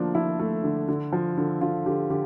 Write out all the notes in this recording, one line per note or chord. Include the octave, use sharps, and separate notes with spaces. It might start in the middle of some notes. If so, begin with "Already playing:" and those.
Already playing: D3 F3 A3 A#3 D4
F3 E4
A3
D3
D3
F3
D3
D3 F4
D3 G4
D3 G4